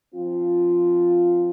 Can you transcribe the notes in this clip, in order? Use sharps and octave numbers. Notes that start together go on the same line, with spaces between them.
F3 C4 F4